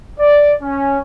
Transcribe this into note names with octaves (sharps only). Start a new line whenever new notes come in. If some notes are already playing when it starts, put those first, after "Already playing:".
D5
C#4